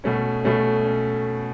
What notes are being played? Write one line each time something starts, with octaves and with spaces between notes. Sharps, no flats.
B2 A3 C#4
B2 A3 C#4
C#4